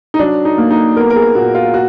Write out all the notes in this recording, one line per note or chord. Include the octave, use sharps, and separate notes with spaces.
D#4
F#3 D4
D#4
A#3
D#4
B3 A#4
A#4
G#4
A#2 F#4
F4
F#4